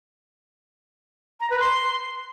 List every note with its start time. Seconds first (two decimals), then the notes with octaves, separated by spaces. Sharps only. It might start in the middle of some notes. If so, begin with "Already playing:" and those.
1.40 A#5
1.50 B4
1.60 C6